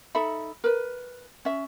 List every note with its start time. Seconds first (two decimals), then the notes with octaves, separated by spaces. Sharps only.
0.15 D#4 A4 E5 B5
0.64 A#4 B4
1.45 C#4 E5